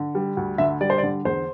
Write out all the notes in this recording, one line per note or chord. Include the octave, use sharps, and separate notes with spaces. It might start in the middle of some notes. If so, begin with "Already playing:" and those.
Already playing: D3
G3
D2
D3 E5
G3 D5
C5
D5
D3
E2 C5